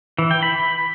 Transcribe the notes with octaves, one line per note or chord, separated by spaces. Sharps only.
E3
G5
B5